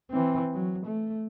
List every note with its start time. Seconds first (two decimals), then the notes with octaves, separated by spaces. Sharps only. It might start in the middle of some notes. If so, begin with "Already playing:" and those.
0.11 E3 C4
0.54 F#3
0.86 A3